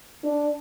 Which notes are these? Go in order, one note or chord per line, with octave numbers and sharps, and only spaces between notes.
D4